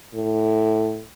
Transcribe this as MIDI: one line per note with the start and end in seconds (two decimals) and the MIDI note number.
0.14 1.02 45